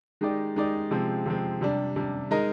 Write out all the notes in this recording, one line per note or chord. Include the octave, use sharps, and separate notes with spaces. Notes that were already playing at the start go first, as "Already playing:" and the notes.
D#3 G#3 D#4 G4 D5
D#3 G#3 D#4 G4 D5
C3 F3 G#3 C4
C3 F3 G#3 C4
C3 G3 D4
C3 G3 D4
G#3 D#4 A#4 D#5